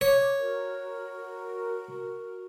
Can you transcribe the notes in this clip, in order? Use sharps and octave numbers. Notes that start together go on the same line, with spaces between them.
C#5 D6
F#4 A#4